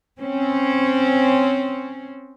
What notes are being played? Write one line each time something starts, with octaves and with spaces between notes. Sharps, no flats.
C4 C#4